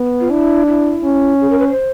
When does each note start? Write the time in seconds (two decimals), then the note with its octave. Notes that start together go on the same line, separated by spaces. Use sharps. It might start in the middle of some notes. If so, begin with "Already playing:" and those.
Already playing: B3
0.21 F4
0.30 D4 E4
0.67 E4
1.04 C#4
1.41 G#4
1.50 A#4
1.59 B4
1.69 C5